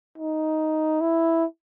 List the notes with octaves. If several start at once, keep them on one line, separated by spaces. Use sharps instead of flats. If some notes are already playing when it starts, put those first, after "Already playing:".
D#4
E4